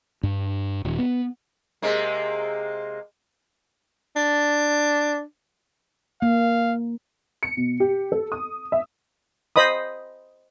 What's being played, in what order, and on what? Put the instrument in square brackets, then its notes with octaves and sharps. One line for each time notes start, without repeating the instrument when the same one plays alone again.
[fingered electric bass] G2
D#1
B3
[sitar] C3 G#3 A#3
[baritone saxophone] D4
[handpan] A#3 [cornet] F5
[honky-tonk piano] C#7
B2
G4
A4
D#6
E5
[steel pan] C5 D#5 B5 D#6